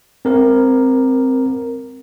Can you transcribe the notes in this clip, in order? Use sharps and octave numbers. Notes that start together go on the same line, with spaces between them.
C4 A#4